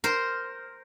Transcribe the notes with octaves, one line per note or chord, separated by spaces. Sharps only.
A#4 C5